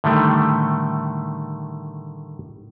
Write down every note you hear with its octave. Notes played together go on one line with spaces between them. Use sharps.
A2 D3 D#3 G3 A3